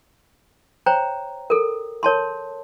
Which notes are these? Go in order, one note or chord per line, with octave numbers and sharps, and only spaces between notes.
C5 C#5 G5 A#5
A4 A#4
A#4 C#5 A5 C6